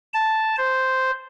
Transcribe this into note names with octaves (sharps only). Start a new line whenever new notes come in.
A5
C5